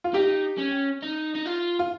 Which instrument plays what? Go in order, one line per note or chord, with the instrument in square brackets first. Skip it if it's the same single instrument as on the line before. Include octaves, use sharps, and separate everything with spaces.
[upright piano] F4
[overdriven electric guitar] D#4 [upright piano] G4
[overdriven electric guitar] C#4
D#4
D#4
F4
[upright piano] F4